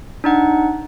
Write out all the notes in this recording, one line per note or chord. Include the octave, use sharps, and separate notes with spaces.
D4 D#4 F#5